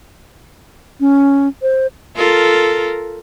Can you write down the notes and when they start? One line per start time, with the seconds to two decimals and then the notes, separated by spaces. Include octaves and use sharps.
1.00 C#4
1.62 C5
2.16 F4 A4 A#4